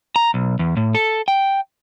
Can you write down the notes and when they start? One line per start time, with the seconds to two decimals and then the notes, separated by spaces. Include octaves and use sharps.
0.16 A#5
0.34 B1
0.59 E2
0.77 A2
0.95 A4
1.28 G5